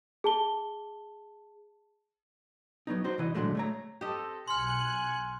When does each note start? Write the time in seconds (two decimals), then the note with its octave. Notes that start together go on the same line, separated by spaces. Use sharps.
0.24 G#4 A5 G7
2.87 F#3 B3 D#4
3.04 D#4 F#4 C5
3.18 C2 E3 D#5
3.35 A#2 D3 F#3 G#3 A3
3.55 A3 C#5 A#5
4.01 C4 G4 A4 D#5
4.48 B1 G#5 C6 F6 F#6 C#7